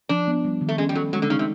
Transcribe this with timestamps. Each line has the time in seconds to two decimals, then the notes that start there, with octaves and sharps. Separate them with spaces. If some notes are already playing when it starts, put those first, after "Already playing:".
0.09 F3 D4
0.28 B3
0.45 G3
0.61 D#3
0.69 A3
0.78 G#3 C#4
0.89 G3
0.95 F#3 A4
1.13 F#3 G#3
1.22 D3
1.30 C#3 D#4
1.39 C3